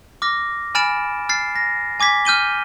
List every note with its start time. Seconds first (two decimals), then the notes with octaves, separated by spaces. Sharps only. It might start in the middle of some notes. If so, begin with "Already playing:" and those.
0.22 D6 F6 A#6
0.75 G#5 B5 F6 A6 D7 E7
1.29 F6 A6 C7
1.56 A#6
2.00 G#5 D6 G#6 B6
2.25 F6 G6 D#7 G7